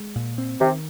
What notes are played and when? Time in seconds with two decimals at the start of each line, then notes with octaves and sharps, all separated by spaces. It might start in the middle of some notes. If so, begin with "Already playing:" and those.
Already playing: G#3
0.15 A#2
0.38 C4
0.61 C3 D#3